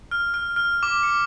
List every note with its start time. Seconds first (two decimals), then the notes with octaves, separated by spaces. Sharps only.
0.11 F6
0.34 F6
0.56 F6
0.83 D6
1.03 C#7